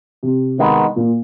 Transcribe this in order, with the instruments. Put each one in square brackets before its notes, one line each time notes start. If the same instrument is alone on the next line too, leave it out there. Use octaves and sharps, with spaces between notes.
[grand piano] C3
[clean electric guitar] D#3 G#3 B3
[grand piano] A#2